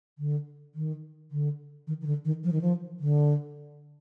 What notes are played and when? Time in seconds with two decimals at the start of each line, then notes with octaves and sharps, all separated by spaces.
0.19 D3
0.75 D#3
1.31 D3
1.87 D#3
2.01 D#3
2.07 D3
2.25 D#3
2.44 F3
2.52 D#3
2.61 F3
3.00 D3